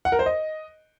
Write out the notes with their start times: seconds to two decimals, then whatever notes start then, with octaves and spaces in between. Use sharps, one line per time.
0.05 F#5
0.12 A#4
0.19 C5
0.26 D#5